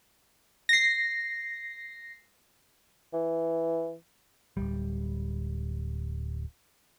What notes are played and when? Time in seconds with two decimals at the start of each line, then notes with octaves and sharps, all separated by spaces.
0.69 A#6 C7
3.14 E3
4.57 D1 C2 G3